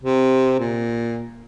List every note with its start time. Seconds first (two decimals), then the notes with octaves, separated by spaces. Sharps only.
0.03 C3
0.60 A#2